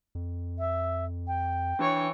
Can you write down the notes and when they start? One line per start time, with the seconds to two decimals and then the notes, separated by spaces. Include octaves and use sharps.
0.15 F2
0.59 E5
1.27 G5
1.79 E3 D4 C#5